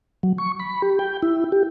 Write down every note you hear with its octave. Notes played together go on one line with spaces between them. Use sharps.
F#3
C#6
B5
G4
G5
E4
G4